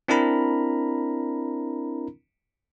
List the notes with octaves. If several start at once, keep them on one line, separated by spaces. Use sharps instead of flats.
C4 D4 E4 A#4 A#5 B5